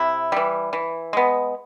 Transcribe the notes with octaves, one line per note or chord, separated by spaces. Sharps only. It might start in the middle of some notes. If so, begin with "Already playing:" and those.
Already playing: C3 E4
E3 G3
E3
G#3 B3